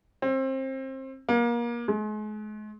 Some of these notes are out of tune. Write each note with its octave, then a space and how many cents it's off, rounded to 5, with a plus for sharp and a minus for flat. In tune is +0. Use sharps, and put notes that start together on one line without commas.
C4 +25
A#3 +30
G#3 +40